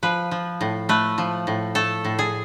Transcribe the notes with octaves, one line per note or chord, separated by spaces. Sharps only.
F3 B4
F3
A2
A3 B4
F3
A2
A3 A4
A2
G#4